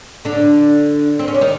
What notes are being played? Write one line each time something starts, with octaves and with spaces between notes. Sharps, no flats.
D3 D4
C4
C#4
D4
D#3 D#4